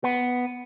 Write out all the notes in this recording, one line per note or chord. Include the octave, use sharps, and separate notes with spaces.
B3